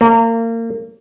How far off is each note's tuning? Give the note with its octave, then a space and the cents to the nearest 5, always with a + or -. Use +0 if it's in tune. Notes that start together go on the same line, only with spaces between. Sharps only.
A#3 -30